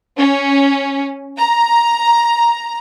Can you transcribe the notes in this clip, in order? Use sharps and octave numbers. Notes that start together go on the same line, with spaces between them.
C#4
A#5